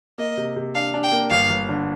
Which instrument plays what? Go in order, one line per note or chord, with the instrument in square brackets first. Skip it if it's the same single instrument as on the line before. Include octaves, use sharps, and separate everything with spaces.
[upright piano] A#3 [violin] D#5
[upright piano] C3
C3
[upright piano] D4 [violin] F5
[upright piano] D4
[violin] G5
[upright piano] A#3
[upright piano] G1 [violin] F5
[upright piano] G1
D3